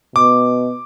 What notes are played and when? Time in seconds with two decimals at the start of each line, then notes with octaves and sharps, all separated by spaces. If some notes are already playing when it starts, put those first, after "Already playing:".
0.16 B2 D6